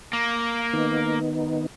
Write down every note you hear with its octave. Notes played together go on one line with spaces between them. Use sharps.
A#3
D#3 B3 D#4